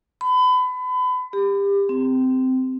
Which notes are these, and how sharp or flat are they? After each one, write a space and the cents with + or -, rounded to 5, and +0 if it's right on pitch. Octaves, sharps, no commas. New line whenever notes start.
B5 +30
G4 +25
C4 -15